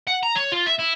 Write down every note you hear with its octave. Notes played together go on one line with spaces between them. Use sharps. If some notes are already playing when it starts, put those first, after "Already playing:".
F#5
A#5
C#5
F4
E5
E4